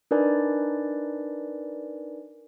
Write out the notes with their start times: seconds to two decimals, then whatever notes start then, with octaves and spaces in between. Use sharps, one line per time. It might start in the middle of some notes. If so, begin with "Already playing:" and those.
0.11 D4 D#4 A#4 B4 D5 G#5